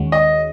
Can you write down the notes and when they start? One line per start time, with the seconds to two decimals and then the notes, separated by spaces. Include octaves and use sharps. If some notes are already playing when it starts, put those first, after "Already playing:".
Already playing: D#2 D#3 G#3 C#4 F#4
0.12 D#5